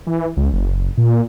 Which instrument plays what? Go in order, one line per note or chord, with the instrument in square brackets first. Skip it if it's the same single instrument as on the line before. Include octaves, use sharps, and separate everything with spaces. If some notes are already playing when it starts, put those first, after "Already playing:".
[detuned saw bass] E3
C#2
F#1
A#2